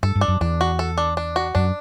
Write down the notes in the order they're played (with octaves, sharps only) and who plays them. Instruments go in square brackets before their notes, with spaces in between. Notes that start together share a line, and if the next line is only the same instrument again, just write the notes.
[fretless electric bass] G2 [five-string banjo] A4
[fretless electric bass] G2
[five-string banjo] D4
[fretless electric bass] F#2
[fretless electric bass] E2 [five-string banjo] D4
[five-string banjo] F#4
A4
D4
D4
F#4
[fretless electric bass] F#2 [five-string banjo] D4